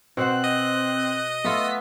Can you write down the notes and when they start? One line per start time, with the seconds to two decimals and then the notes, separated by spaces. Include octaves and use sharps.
0.17 B2 C4 C5 F#5 F#6
0.44 D#5
1.44 A3 B3 F4 A4 B6